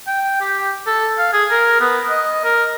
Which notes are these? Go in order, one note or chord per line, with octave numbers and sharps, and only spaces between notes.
G5
G4
A4
F5
G#4
A#4
B3
D#5
A#4